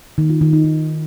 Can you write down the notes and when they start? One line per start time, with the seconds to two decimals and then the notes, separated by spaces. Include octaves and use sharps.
0.18 D#3
0.30 F4
0.41 D#3
0.53 D#4
0.65 D#3